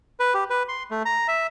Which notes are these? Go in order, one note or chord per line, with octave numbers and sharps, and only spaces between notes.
B4
G4
B4
C6
A3
A#5
E5